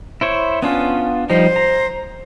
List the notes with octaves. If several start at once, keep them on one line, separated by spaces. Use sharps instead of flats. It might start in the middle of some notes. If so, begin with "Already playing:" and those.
E4 C5 C#5
B3 C#4 D4 F4
F3 G3 D#4 C5
A#5